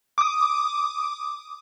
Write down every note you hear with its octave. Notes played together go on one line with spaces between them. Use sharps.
D6 D#6